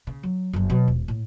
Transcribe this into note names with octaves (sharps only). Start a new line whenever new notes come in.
C#3
F#3
F#1 F#3
B2 F#3
D#1
A2